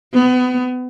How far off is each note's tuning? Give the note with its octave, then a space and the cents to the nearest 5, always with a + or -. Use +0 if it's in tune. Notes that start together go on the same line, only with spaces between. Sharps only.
B3 +30